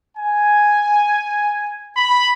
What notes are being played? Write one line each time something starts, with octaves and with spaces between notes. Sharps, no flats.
G#5
B5